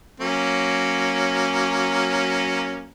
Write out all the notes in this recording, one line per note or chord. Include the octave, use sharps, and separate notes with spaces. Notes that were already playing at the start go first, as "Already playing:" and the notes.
F#3 A#3 C#4